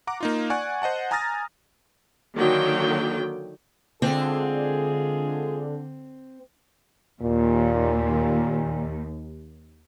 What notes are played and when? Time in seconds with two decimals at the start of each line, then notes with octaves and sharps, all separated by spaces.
0.07 F#5 A#5 D6
0.20 A#3 D#4 F4
0.50 D5 F#5 G#5 C#6 F#6
0.82 C5 D#5 F#5 A5
1.11 G#5 A#5 D#6 F6 A6 A#6
2.37 D3 D#3 F#3 A#3 G5
4.02 D3 G#3 C4 F4 G#4
7.22 D#2 A#2